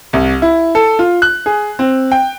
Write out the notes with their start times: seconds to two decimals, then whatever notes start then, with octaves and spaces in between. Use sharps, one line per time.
0.13 C2
0.42 E4
0.75 A4
0.99 F4
1.22 F#6
1.46 G#4
1.79 C4
2.12 G5